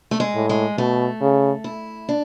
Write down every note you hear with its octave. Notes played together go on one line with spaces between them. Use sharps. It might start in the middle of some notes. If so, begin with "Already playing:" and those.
A3
G#3
A2
G#3
B2 A3
C#3
E4
D4